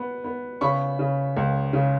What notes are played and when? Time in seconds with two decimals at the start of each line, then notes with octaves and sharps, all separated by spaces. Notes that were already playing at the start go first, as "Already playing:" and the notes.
Already playing: B3
0.24 B3
0.61 C#3 B5 C#6
0.99 C#3
1.37 C#2
1.73 C#3